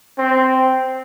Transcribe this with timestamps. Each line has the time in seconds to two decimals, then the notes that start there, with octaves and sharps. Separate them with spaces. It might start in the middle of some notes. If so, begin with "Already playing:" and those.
0.18 C4